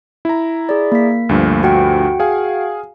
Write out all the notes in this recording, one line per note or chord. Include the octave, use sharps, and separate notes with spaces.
E4 A#5
G#4 D5
A#3 B6
D2 G2 F3
F#4 F#5 G5
G#4 F5 G#5